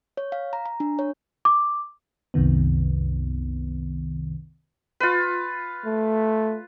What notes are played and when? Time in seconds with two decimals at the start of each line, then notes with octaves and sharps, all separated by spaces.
0.17 C#5
0.32 F5
0.53 A#5
0.66 A#5
0.80 D4
0.99 C#5
1.45 D6
2.34 C2 F#2 C3 D#3 B3
5.00 F4 B4
5.85 A3